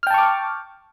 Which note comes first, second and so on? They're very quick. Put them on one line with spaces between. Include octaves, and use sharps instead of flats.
F6 G5 A5 C#6 D6